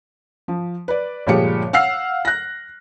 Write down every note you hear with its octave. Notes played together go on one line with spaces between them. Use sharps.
F3
B4 D5
G1 A#2 F3 G#3 G4 C#7
F5 F#5 E6 F6 C7
F#6 A#6